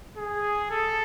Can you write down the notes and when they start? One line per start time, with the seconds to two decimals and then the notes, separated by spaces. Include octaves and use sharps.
0.17 G#4
0.71 A4